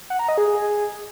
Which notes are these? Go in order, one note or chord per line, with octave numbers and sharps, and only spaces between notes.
F#5
A#5
D#5
G#4